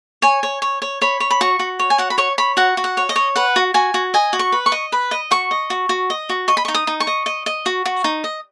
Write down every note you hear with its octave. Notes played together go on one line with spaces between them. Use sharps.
C#5 G#5
C#5
C#5
C#5
C#5 B5
C#5
B5
F#4 C#6
F#4
C#5
G#5
F#4 F#5
B5
C#5 C#6
C#5 B5
F#4 F#5
F#4
F#5
C#5
D#5
C#5
B4 F#5
F#4
F#4 G#5
F#4
D#5 G#5
F#4
C#6
B4
C#6
D#5
B4 B5
D#5
F#4 C#6
D#5
F#4
F#4
D#5
F#4
D#5 C#6
B5
C#6
D#4
D#6
D#4
C#6
D#5
D#5
D#5
F#4
F#4
D#4
D#5